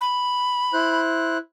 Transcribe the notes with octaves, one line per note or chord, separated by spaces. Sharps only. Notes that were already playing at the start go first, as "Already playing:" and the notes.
B5
E4 C5 F#6